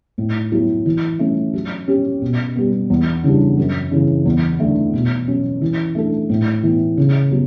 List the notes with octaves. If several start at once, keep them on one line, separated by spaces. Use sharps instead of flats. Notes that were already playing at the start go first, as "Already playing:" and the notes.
A2
F#3 B3 E4
E3
A3 C#4
F#3
C#4 G4
B2
G3 B3
E2
C#3 E3 G3 D4
F#2
C#3 E3
E2
D3 A3
B2
F#3 C#4
E3
A3 D4 A4
A2
E3 B3
C#3
F#3 B3